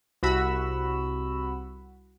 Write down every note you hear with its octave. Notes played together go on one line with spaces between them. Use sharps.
C2 F#4 B5 E6